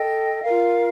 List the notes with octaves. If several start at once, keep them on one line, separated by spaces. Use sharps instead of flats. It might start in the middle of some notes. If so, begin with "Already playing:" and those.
Already playing: A4 D#5 G5
F4 A#4 F5